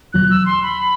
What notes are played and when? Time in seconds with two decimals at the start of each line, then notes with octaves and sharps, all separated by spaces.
0.13 E2 B2 F#3 F#6
0.30 E6
0.46 C6
0.63 B5